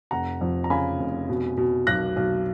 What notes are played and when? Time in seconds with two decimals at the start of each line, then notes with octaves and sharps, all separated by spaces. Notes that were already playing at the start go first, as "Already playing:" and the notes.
0.11 F1 F#5 A#5
0.41 F2
0.64 A#5
0.70 C#3 G#5 B5
0.99 F1
1.29 B2
1.58 B2
1.87 B1 F#6 A#6
2.16 B1